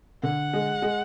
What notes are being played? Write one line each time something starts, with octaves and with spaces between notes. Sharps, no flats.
D3 F#5
G#3
G#3